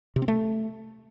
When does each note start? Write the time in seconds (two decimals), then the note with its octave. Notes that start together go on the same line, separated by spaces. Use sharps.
0.16 C3
0.22 C4
0.28 A3